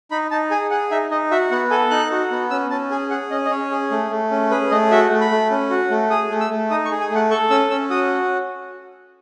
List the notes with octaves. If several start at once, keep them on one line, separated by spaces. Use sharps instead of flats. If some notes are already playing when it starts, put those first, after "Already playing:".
D#4 B5
D#4 A5
G#4 G#5
G#4 F#5
D#4 E5
D#4 D#5
F#4 E5
B3 F#5
A4 G#5
D#4 F#6
F#4
B3
C#4 E6
C#4 A5
G#4 G#5
G#4 F#5
C#4 D#5
D#5
C#4 C#5
G#4
A3
A3
C#4
G#4 B4
A3 D#5
F#4 E5
A3
B5
A3
C#4
F#4
A3
G#4 D#6
A3
E6
A3
D#4 D#6
C#6
G#4
G#5
A3
F#5
A4 C#6
C#4 E6
C#4 E6
F#4 D#6